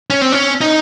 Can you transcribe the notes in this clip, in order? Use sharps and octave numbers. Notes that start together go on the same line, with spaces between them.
C#4
C4
C#4
D#4